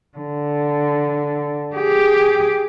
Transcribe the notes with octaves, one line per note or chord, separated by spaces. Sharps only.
D3
G4 G#4